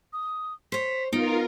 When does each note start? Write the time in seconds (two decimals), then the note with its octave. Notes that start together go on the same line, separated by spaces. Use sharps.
0.13 D#6
0.72 C5 C#5 B6
1.13 B3 D#4 F4 A#4 D7